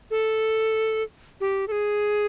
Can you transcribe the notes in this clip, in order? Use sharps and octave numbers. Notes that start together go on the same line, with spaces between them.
A4
G4
A4
G#4